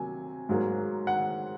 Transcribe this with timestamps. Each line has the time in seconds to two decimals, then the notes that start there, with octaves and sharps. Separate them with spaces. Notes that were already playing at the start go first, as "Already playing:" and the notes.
Already playing: C3 F#3 A#3 G#5
0.49 G#2 F#3 A#3
1.07 F#5